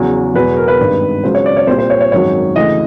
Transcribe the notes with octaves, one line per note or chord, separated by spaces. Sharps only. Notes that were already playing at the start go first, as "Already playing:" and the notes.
Already playing: E2 C#3 F#3
E1 E2 B2 F#3 B4
A#4
B4
G#1 G2 D#3
C#2 C#3 F#3 C5
C#5
D5
C#5
C2 A#2 G3 C5
C5
C#5
C#5
G#1 F#2 D#3 F#3 C#5
D2 C#3 E3 D#5